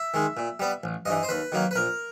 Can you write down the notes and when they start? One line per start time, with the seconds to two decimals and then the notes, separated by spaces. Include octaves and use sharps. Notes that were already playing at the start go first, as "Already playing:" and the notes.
Already playing: E5
0.14 D#3 G#3
0.37 A#2
0.60 G3 B3
0.84 A1
1.05 G2 E3 D#5
1.23 C5
1.28 D#2 B4
1.52 D#3 F#3 A#3
1.71 B4
1.76 A#1 A#4